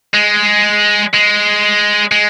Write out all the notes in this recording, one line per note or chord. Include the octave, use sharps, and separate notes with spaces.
G#3
G#3
G#3